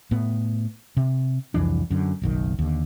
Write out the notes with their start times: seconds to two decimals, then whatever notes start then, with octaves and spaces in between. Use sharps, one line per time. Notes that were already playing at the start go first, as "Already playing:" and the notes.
0.11 A2 B3
0.97 C3
1.54 C2 F2 E3 D4
1.90 F#2 D3
2.22 F#1 B1 D#3
2.59 D#2 D3